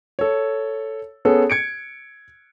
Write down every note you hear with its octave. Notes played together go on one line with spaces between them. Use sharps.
A4 C#5
B3 C#4 G#4 A4
G#6 C#7 D7